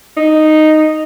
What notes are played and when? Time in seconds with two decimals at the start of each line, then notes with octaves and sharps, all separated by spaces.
0.17 D#4